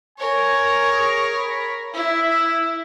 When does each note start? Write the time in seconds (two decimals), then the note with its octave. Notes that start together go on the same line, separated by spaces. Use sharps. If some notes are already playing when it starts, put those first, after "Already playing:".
0.18 A#4 C#5 G#5
0.91 G#4
1.36 B5
1.94 E4 E5